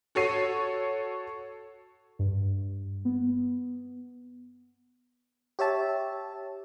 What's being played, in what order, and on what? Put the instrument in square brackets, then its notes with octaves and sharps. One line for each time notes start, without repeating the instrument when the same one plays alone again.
[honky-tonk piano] F#4 A4 C#5 C7 D#7
[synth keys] G2
B3
[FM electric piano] G4 C#5 E5 A5